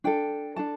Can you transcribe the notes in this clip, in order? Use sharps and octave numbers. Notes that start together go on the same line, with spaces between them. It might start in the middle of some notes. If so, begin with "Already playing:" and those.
D4 A4 G5
D4 A4 A5